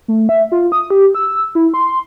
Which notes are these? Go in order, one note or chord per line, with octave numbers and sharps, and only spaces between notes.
A3
E5
F4
D#6
G4
E6
E4
C6